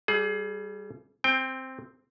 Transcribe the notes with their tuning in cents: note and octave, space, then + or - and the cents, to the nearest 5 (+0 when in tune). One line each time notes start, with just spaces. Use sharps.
G3 -10 G#4 +30
C4 +0 G5 +20